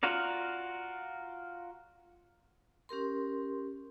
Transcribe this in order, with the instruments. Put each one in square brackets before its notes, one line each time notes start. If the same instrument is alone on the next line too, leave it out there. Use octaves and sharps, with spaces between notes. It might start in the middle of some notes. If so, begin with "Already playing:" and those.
[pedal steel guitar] F4 F#4 A#4 D5
[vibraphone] C#4 G4 A#4 C6